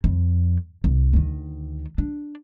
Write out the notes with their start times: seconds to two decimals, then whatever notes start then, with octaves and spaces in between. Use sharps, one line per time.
0.04 F2
0.84 C2
1.13 D2 D#3
1.98 D4